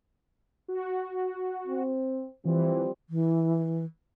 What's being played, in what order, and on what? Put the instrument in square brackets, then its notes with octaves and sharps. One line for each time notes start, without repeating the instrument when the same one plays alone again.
[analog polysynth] F#4
[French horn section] C4
[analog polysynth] E3 [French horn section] F3 G3 C4
[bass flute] E3